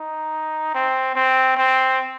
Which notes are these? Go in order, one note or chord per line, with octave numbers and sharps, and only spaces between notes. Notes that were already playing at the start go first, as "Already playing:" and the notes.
Already playing: D#4
C4
C4
C4